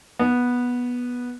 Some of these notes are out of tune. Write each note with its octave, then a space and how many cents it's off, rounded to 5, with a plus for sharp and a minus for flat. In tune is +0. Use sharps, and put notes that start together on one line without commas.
B3 -10